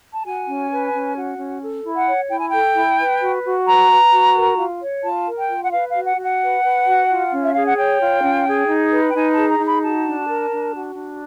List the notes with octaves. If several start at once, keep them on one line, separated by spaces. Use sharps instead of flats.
A5
F#4 G#5
C#4
B4
C#4
F#4
C#4
A4
E4
F#5
C#5
E4 G5
G#5
A4 G5
E4
B4
F#4
F#4
B4 A#5
B4
F#4
A#4
F4
C#5
F4 A5
A#4
G5
F4
F#5
B4 F5
F5
F#4
F#5
F#4
F#5
B4
B4
F#4
F4
C#4
E5
G#4 F5
F#5
C#5 G5
F4
C#4
G#4
D#4
B4
G5
D#4 G#5
A5
G#4
A#5
D#4
B5
F#4 A5
D4
A#4
D4
F#4
D4